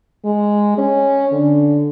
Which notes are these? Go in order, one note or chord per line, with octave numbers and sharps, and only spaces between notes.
G#3
C#4
D3